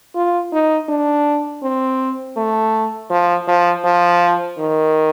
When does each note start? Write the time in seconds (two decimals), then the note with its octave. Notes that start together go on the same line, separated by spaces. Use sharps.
0.15 F4
0.53 D#4
0.89 D4
1.63 C4
2.37 A3
3.10 F3
3.48 F3
3.85 F3
4.59 D#3